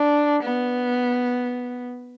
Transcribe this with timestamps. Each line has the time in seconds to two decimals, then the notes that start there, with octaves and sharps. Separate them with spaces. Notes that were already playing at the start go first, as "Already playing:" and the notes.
Already playing: D4
0.44 B3